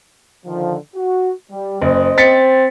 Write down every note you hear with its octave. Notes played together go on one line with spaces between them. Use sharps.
D3 D#3 F3
F#4
G3
F#1 C5 D#5
C4 A6 B6 C#7